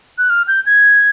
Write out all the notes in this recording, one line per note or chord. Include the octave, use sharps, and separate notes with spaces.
F#6
F6
G6
G#6